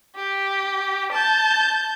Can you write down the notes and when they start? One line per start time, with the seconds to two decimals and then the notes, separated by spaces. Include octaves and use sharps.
0.16 G4
1.12 A5 G6